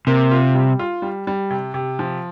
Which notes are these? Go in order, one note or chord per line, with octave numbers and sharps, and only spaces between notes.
C3 A#3
F4
G3
F4
G3
G3
C3
C3
F3